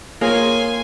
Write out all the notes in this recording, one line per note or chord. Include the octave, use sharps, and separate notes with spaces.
A#3 F4 G#4 C#5 G#5 C6